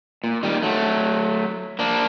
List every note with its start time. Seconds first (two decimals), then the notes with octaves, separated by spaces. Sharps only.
0.24 A#2
0.43 D#3 G3
0.62 F#3 A3
1.79 A#3 D4